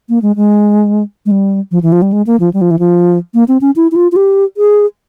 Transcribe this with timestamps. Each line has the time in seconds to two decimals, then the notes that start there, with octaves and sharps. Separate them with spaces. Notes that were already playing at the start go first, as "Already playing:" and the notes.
0.09 A#3
0.22 G#3
0.36 G#3
1.26 G#3
1.31 G3
1.71 F3
1.83 E3
1.92 F3
2.02 G3
2.13 G#3
2.27 A#3
2.40 F3
2.53 G3
2.61 F3
2.71 E3
2.79 F3
3.34 A#3
3.48 C4
3.61 C#4
3.76 E4
3.92 E4
3.96 F4
4.12 F4
4.16 G4
4.57 G#4